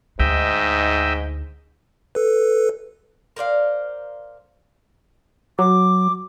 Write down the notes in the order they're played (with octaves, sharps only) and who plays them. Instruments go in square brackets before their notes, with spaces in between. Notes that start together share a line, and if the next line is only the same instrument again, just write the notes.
[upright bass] D2 D#4 [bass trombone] G#2 [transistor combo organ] D#5 E5 G5
[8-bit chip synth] A4 B4
[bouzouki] A#4 C5 D5 F5
[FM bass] F#3 [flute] D6